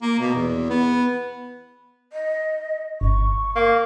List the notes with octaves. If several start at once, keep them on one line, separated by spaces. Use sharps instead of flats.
A#3
B2
E2
B3
D#5
G1 C#6
A#3